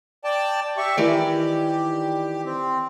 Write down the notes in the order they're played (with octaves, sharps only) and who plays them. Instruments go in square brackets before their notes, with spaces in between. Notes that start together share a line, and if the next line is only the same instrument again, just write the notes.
[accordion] D5 G5 A5
G4 E5 C#6
[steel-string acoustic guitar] D#3 E3 D5 [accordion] G4
[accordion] C4